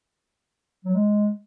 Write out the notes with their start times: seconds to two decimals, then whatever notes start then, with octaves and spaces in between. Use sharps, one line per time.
0.85 F#3
0.95 G#3